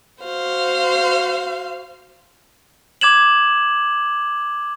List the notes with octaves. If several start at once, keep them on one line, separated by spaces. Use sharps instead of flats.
F#4 C5 F5
D6 G#6 E7 F#7